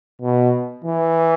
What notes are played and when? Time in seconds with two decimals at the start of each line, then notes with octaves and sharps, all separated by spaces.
0.22 B2
0.84 E3